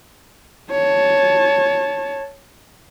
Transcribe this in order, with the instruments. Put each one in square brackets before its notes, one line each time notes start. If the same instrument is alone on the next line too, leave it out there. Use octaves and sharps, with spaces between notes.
[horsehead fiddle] C#5 A5